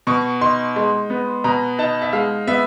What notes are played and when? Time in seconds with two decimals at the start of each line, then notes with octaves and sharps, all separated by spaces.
0.07 B2 C#6
0.41 D#4 C6
0.76 G#3
1.10 B3
1.44 B2 A#5
1.79 D#4 A5
2.02 E5
2.13 G#3 F5
2.47 B3 E5